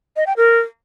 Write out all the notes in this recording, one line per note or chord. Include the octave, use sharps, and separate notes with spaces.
D#5
G5
A#4